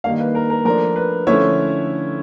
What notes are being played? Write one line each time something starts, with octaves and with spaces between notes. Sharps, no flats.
D#3 G3 A#3 D4 F5
B4
A#4
A#4
F3 A3 D4 A#4
B4
D3 F3 A3 C#4 E4 C#5